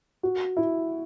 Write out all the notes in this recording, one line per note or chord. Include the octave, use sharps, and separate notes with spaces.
F#4
E4